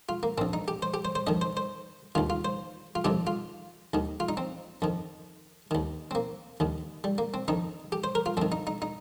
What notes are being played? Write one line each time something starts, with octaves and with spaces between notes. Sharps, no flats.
F4
A#3
A#1 A#2 C4
D#4
G4
C5
G4
C5
C5
F2 D#3 D#5
C5
C5
D#2 D#3 F4
F4
C5
F4
F2 C3 D#3 G4
F4
D#2 D#3
F4
D#4
C4
F2 D#3
D#2 D#3
C4
A#3
D#2 D#3
G3
A#3
C4
F2 D#3 D#4
G4
C5
A#4
F4
F2 D#3 C4
D#4
D#4
D#4